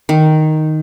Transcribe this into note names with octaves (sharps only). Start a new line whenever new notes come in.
D#3